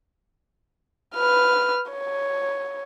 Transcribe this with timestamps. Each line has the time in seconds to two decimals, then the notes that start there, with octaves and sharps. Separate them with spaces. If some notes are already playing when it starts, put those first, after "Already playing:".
1.15 B4 F6
1.92 C#5